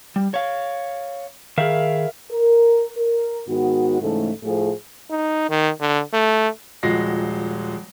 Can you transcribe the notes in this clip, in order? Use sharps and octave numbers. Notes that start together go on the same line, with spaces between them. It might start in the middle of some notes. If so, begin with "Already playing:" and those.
G3
C#5 F5
D#3 G#4 A#4 E5 F5
A#4
A#4
G#2 D#3 B3 F#4
G#2 C#3 E3 A3
A2 F3 A3 G#4
D#4
D#3
D3
A3
D#1 F3 G#3 F#4 A#6 C7